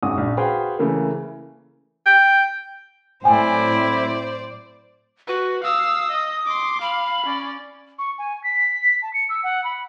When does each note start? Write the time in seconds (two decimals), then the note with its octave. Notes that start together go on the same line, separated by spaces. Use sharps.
0.03 G#1 F#2 F#4 D#6
0.18 A#1
0.37 F#4 G#4 B4 C5 F5 G5
0.79 C#3 E3 A3 A#3
2.06 G5
3.24 A2 F#3 C4 E4 C5 D5 G5 G#5
5.28 F#4 B4
5.64 F5 D#6 E6
6.11 D#5
6.46 C6 D6
6.81 F5 B5
7.26 C#4 D5
7.98 C#6
8.18 G#5
8.43 B6
9.02 A5
9.13 C#7
9.29 E6
9.43 F#5
9.64 B5